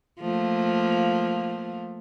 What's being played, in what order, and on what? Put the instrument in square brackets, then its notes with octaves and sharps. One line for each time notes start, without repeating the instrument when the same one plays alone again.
[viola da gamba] F3 A3 A#3